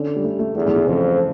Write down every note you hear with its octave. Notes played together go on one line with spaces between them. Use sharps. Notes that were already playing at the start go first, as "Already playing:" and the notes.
Already playing: D3 C#4
G3
A3
A3
E2 A3
E3
E3
F2 C#3